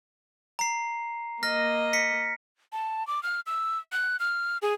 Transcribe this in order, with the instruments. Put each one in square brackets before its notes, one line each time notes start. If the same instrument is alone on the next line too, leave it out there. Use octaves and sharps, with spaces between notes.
[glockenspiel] A#5 C7
[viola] A#3 D#5 [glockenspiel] F6 A#6
[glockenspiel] B6 C#7
[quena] A5
D6
F6
E6
F#6
F6
G#4